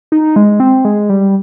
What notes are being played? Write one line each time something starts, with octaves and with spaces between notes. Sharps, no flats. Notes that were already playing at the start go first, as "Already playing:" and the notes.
D#4
G#3
C4
G#3
G3